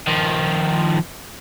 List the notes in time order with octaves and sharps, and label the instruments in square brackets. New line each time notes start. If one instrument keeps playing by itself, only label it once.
[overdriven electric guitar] D#3 F3